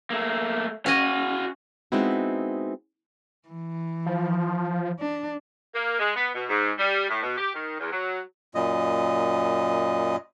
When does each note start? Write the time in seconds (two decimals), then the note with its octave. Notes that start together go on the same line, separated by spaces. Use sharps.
0.10 A3 A#3
0.86 C#4 F#4 D#5 F5
1.92 G#3 B3 C4 D#4 E4 F#4
3.49 E3
4.06 F3
4.99 D4
5.75 A#3
5.99 G#3
6.16 B3
6.34 B2
6.49 G#2
6.79 G3
7.10 A2
7.23 B2
7.38 G4
7.54 D#3
7.80 E2
7.92 F#3
8.55 F#2 A#2 D#5